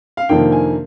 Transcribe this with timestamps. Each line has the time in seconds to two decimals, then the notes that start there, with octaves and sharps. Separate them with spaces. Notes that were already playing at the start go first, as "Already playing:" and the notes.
0.17 F5
0.29 F2 C3 D#3 A#3 D4 G5
0.52 G#5